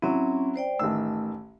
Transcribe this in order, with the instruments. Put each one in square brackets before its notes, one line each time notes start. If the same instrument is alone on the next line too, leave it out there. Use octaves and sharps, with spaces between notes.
[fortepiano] F#3 E4 [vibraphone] C4 C#4
[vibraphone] C5 D5 G5
[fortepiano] A1 D#3 E6 [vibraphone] A3